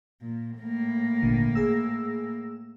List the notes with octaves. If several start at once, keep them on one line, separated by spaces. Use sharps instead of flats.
A#2
A2 A#3
G#1 A#2 D3
G#4 E6